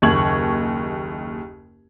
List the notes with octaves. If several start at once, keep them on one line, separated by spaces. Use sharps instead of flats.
F#1 D#2 C#6 G#6 F#7